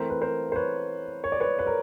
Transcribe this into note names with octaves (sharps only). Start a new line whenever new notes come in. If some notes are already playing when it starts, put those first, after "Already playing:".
Already playing: E3 A3 C4 A#4 C5
B4
A#4 C5
C5
B4 C#5
C#5
D5
B4 C#5
B4
A#4